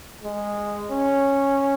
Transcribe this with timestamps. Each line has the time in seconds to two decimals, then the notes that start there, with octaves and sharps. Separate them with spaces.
0.23 G#3
0.90 C#4